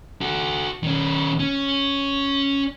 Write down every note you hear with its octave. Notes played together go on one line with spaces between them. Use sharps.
F#4 A4
D#3 C#4
C#4